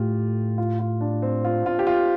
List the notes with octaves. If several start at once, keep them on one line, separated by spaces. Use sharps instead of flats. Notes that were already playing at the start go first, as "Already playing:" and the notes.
Already playing: A2 A3 F4 G4
F4
F4
D4
C4
F4
F4
G4
F4